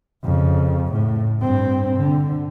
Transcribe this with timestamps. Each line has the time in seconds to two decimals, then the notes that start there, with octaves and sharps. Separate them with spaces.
0.24 F2 C#3
0.92 A2
1.40 G2 C4
1.97 D3